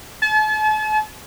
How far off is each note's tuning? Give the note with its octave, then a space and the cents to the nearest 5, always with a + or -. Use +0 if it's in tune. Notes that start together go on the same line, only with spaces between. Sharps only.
A5 -40